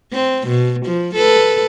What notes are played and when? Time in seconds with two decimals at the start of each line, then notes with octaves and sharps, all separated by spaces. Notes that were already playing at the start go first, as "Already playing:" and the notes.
0.13 C4
0.48 B2
0.86 F3
1.15 A4 B4